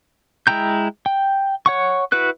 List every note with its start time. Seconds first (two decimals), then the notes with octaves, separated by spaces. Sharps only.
0.47 G#3 E4 G5 A#5 G6
1.06 G5
1.66 C#5 F#5 C#6
2.12 E4 F#4 B4 F#6